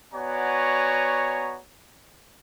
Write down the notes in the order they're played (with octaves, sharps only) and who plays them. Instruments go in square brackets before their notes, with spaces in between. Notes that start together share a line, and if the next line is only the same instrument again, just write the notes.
[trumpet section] B3 F#4 C#5 D5 G#5 A#5